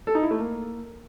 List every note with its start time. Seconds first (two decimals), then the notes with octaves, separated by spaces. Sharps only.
0.07 A4
0.15 D#4
0.23 E4
0.31 A3
0.39 A#3